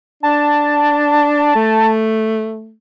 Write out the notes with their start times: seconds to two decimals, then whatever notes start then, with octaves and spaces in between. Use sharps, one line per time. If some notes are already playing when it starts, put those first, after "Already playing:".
0.23 D4 A5
1.55 A3